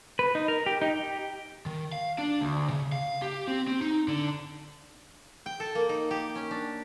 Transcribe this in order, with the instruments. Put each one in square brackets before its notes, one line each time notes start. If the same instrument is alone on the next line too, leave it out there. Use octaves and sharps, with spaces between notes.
[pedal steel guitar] B4
D#4
A#4
G4
D#4
G4
[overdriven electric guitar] D#3
F5
D4
D2
C#3
F5
G4
C4
C4
D#4
D3
[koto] G5
A4
A#3
D#4
G4
C#4
D4